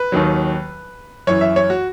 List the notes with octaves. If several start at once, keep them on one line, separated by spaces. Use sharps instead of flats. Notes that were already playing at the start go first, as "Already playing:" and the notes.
Already playing: B4
D#2 D#3 F#3
F#2 E3 C#5
E5
C#5
F#4